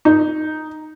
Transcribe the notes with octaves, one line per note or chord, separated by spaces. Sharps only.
D#4